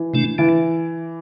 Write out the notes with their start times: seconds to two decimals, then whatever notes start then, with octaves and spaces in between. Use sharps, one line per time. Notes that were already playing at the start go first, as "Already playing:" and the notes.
Already playing: E3
0.14 C3 A3 D4
0.38 D3 E3